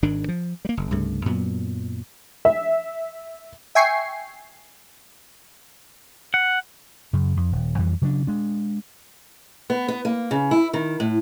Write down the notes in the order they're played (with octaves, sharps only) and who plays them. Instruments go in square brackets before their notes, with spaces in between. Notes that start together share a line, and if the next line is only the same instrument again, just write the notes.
[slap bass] G#1 G#2 D#3 D4
F3
G3 A#3
F#1
C2 G2 C#3 A3
F#2 A#2 F#3 B3
[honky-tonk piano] E5
[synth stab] E5 G5 G#5 C#6 C7
[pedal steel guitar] F#5
[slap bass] F#2 C#3
F2
D#1
F2 E3 G3
C#3 F#3 A#3 D4
G#3 D4
[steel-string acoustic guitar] B3
B3
A#3
C#3
E4
D#3
A2